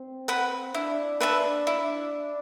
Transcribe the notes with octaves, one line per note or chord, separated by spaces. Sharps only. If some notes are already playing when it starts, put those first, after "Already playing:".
Already playing: C4
B4 F#5 B5
D4 E4
D4 B4 E5 A5
E4